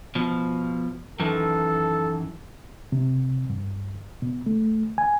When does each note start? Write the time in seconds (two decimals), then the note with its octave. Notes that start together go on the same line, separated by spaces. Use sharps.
0.15 B2 F3
1.20 F#2 D#3 E3 A4
2.92 C3
3.50 G2
4.22 B2
4.46 A3
4.98 G#5